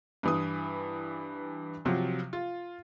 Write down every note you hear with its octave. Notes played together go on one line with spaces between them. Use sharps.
G2 E3 D#6
C3 F3 F#3
F4